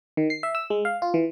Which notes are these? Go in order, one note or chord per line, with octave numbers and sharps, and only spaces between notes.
D#3
C7
E5
E6
G#3
F5
F4
E3